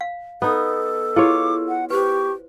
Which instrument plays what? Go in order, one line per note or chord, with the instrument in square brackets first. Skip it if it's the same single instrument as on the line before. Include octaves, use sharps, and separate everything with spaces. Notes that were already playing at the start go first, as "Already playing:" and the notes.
[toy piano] F5
[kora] B3 D#4 [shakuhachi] A4
[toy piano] E4 G4 G#4 [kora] F4 C#5 [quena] D6
[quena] F#5
[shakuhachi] G4 [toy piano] B4 C5 [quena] C#6